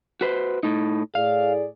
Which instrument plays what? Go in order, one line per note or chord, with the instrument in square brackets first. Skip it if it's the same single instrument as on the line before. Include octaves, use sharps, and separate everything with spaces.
[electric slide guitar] F#4 B4 C5
A2 D#4
[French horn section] A2 G#4 D5 [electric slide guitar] F5